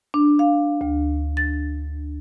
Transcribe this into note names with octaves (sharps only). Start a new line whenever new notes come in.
D4
F5
D2
A6